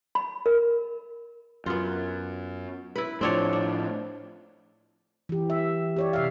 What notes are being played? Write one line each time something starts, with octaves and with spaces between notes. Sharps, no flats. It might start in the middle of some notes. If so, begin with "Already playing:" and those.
B5
A#4
F#2 B3 F4
E4 B4
A2 F3 C4 D4 C#5
D4
E3 G4
E5
G4 C#5 D5
C3 E5 F5